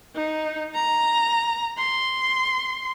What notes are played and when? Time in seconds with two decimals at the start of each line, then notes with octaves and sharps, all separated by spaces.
0.15 D#4
0.74 A#5
1.77 C6